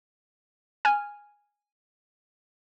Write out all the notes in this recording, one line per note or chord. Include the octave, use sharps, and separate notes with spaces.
G#5 F6